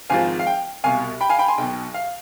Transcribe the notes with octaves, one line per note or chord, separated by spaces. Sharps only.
G#1 G#2 F3 F5 G#5
F5
G5
C2 B2 F5 G#5
G5 B5
F5 G#5
G5 B5
G#5 C6
B1 B2 G5
F5